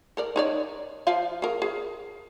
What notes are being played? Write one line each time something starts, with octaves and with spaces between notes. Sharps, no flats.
A4 A#4 D5
D#4 C#5 D5
F3 F4 F5
G#4 A#4
G#4